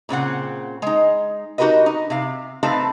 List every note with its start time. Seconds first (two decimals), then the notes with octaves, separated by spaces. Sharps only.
0.09 A#2 C#3 C4 F#5
0.82 G#3 D#4
1.58 D#4 F#4 G4 A#4 B4 D#5
1.86 D#4
2.10 C3 F5
2.63 A3 C4 D#4 A4 B4 F5